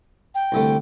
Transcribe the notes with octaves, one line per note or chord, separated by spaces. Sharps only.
G5
C2 D3 A3